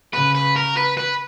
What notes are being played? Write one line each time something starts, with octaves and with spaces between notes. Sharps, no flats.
C#3 B4
B4
A#4
B4
B4